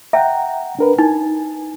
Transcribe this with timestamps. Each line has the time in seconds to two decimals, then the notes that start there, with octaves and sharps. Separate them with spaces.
0.13 E5 F#5 G5 A#5
0.79 D4 A#4 B4
0.99 D#4 G#5